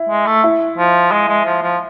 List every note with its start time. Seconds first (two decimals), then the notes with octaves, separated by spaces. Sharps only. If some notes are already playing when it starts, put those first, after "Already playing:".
Already playing: E4
0.09 G#3
0.26 A3
0.44 E4
0.78 F3
1.12 G#3
1.28 G#3
1.45 F3
1.62 F3